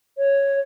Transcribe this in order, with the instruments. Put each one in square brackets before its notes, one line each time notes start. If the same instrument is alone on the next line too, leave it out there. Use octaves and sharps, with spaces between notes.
[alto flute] C#5